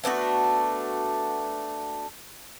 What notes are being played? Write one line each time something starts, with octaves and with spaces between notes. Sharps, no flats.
A3 B3 D4 F#4